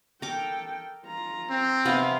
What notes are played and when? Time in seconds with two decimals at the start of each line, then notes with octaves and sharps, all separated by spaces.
0.22 A4 A#4 G5 D6
1.05 F4 A#5
1.50 C4
1.85 C3 B3 F5 A#5